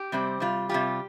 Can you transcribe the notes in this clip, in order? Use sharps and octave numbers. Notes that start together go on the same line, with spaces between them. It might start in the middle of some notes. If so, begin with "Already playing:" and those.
Already playing: G4
C3 G3 C4
C3 G3 F4
C3 G3 F4 G4